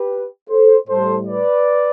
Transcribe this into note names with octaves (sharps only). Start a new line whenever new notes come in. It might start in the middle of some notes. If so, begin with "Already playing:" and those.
Already playing: G4 B4
A4 C5
A2 G3 A4 C5
B4 D5